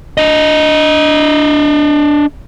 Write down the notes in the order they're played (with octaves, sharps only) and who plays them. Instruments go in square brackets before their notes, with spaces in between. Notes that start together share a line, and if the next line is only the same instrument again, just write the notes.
[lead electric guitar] D4 D#5